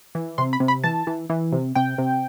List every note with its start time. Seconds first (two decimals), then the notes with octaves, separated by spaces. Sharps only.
0.15 E3
0.38 C3 C6
0.53 B5
0.60 C3
0.68 B5
0.84 E3 A5
1.07 E3
1.30 E3
1.52 C3
1.75 C3 G5
1.98 C3